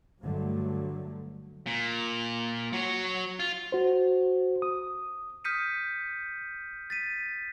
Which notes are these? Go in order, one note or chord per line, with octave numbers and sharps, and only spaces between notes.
G2 D3 F#3 A3
A#2
F#3 C#5
F4
F#4 C5
D#6
D#6 F6 G6 B6 C#7 D#7
A6 B6 D#7